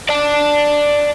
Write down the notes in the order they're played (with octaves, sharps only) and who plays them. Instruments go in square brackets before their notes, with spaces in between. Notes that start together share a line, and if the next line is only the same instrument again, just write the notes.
[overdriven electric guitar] D5 A5